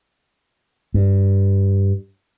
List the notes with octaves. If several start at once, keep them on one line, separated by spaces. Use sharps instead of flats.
G2